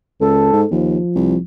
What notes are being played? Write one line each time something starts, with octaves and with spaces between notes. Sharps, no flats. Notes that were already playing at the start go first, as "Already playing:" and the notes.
C#2 A4
G#2
D#2 F3
C2